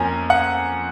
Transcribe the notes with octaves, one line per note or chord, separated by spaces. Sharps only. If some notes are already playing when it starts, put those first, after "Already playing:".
Already playing: F2 F3 A#3 C#4 G#5 A#5
F#5